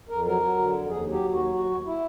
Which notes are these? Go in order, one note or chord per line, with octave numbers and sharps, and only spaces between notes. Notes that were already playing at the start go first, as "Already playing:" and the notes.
F2 A#4
F#3 A#4
F#3
D3
F2
D#2 G#4
F#3
G4
D#2
F#4
F#3
D#2 F#4
D#2
E4